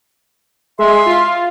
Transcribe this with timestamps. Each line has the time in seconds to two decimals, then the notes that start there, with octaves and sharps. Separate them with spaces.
0.79 G#3 E5 C6
1.06 F4